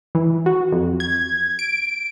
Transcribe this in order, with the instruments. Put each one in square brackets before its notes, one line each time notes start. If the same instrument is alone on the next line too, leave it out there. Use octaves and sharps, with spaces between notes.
[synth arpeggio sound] E3
F#4
F2
G#6
D7